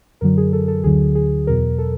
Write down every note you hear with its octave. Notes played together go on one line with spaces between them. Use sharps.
F#2 D3 F#3 A#4
G#4
A4
A4
D2 D3 F#3 G#4
G#4
E2 B2 F#3 A#4
A4